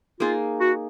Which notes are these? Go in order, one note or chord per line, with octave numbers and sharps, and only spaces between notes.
A#3 D#4 F4 G#4
F#4